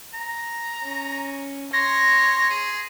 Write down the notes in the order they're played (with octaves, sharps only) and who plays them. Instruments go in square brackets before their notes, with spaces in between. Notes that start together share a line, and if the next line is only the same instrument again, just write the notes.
[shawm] A#5
[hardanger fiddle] C#4
[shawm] C#5 [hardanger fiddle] C6 [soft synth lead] A#6
[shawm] G#4